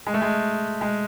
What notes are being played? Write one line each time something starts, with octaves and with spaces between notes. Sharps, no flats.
G#3
A3
G#3
G#3